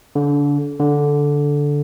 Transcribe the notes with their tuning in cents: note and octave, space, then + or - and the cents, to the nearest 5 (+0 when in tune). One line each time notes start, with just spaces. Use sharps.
D3 -30
D3 -10